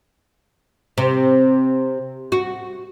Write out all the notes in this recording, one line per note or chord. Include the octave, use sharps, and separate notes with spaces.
C3
F#4